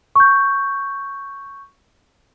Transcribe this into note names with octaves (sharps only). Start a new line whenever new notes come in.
C#6 G6